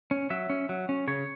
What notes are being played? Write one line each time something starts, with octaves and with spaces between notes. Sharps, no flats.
C#4
F#3 E5
C#4
F#3
C#4
C#3 C#5